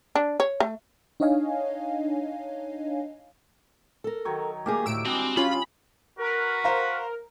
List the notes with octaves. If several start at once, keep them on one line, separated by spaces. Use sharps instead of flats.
D4
C#5
A3
D4 D#4 C#5 D#5 F5 G#5
A4 A#4
D#3 F#3 C#5
A3 A#3 G4 G#4 F5
D2 A2 E6 D7
G3 G#3 C4 D4 F#4
C#3 C#4 F4 B5
F#4 A#4 B4
C5 F5 A#5